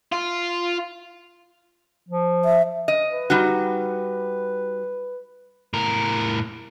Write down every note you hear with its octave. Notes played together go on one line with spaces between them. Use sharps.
F4
F3
E5
D#5
B4
G3 D#4 F#4
A2 A#4